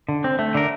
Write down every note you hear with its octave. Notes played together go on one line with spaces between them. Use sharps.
D3
C4
A3
D3 A#4